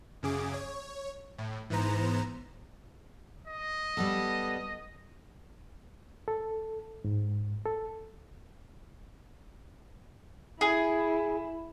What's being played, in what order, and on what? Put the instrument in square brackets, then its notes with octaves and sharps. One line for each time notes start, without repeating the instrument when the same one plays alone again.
[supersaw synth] F#2 C#3 G#4 D6
C#5
A2
G#2 E3 B3 C5 A#5 E7
[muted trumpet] D#5
[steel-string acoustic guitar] G3 B3 A4
[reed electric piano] A4
G#2
A4
[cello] E4 [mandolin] G#4